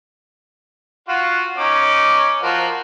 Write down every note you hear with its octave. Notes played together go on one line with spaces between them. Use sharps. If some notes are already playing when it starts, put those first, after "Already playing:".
F4 F#4 F5
C#4 D#4 D6
F3 F#4 A#4